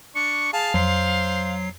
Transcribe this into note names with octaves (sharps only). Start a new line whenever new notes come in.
D4 C#6 C#7
G#4 F5 A5
F2 F#3 C5 C7